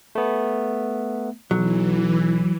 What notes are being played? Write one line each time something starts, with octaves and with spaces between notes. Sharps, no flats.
A3 B3
B1 E3 F#3